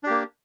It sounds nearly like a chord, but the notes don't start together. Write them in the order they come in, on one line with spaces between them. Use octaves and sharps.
D4 G4 A#3